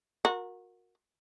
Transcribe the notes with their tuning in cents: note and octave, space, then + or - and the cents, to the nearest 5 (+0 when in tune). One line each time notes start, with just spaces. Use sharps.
F#4 -30 A#4 +0